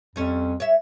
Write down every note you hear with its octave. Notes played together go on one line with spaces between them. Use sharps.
F2 G3 C#4
C#5 E5